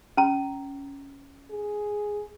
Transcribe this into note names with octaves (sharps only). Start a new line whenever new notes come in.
C#4 A#5
G#4